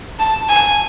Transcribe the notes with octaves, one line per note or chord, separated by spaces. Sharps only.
A5
G#5